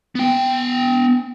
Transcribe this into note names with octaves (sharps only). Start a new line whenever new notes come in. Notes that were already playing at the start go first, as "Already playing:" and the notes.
B3 G5